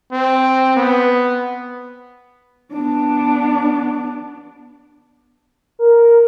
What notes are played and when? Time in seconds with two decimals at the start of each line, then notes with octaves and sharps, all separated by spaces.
0.12 C4
0.76 B3
2.73 B3 D4
5.79 A#4